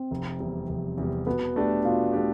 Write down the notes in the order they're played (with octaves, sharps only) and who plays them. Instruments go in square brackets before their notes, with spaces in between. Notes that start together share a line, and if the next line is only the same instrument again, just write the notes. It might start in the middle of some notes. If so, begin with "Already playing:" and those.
Already playing: [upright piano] C4
[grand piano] F1
E2 C3 G3
F1
E2 C3 G3
[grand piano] B2 [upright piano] B3
[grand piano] A3 D4 G4
[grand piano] B2 [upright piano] F4
[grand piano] A3 D4 G4